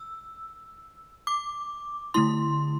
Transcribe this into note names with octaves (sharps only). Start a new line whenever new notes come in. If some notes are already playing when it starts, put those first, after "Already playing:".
Already playing: E6
D6
D3 A3 E4 C6